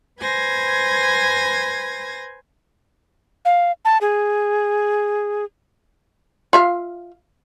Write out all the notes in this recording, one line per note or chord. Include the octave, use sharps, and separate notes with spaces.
B4 C5 G#5 G#6 A#6
F5
A5
G#4
F4 E5 F5